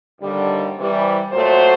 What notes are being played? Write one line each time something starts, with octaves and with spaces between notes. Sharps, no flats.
D#2 D3 G3
C3 E3 G3
A#2 F#3 A3 C5